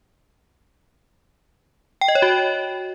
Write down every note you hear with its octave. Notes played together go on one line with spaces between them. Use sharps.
G5
D#5
C#5
F#4